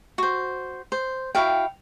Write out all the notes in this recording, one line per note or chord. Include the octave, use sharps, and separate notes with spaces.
F#4 C5
C5
E4 F#4 F5 G5